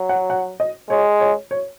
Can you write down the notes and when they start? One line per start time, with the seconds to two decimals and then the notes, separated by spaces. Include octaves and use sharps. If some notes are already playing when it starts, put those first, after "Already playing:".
Already playing: F#3
0.09 F#5
0.30 F#5
0.60 D#5
0.90 G#3 C#5
1.20 C#5
1.51 C#5